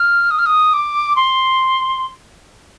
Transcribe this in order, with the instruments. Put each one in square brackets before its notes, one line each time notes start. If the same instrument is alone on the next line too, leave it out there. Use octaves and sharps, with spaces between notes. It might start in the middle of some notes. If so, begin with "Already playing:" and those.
Already playing: [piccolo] F6
D#6
F6
D#6
D6
C6